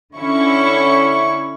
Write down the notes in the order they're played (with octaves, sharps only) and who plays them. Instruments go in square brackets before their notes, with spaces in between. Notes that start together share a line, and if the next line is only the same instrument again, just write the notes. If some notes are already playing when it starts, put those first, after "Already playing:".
[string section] D3 C#4 E4 C#6